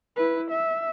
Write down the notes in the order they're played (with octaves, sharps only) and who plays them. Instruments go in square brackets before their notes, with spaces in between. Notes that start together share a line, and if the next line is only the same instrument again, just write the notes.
[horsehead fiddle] E4 B4
E5